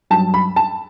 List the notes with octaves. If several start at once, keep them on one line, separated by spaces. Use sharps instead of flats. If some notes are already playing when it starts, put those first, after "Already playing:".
G2 F#3 A5
B5
A5